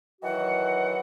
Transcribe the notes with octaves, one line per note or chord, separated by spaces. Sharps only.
D#3 E3 F#3 F#4 F#5